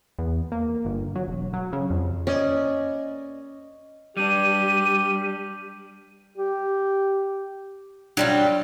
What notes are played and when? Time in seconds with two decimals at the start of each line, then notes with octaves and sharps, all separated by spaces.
0.19 E2
0.52 A#3
0.85 G1
1.15 F#3
1.28 E1
1.53 F#3
1.73 C#3
1.90 F2
2.27 A#3 C#4 D5 D#5
4.17 G3 D4 G4 D#7
6.38 G4
8.17 F#3 G3 D4 F4 D5